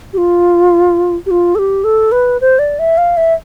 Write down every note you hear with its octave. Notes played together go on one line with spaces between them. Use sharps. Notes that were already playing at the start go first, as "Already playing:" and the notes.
G4
F4
G4
F4
A4
G4
A4
B4
C5
D5
E5
F5
E5